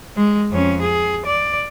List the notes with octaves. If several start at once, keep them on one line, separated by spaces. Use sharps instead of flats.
G#3
F2 C#4
G#4
D5